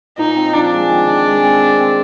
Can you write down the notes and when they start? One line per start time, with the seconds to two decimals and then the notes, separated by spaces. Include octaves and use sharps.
0.18 A#2 D#4
0.36 C4
0.53 F3 D4
0.71 G#3
0.89 D#3
1.07 D#3
1.26 G#3
1.43 C4
1.61 C4
1.79 C4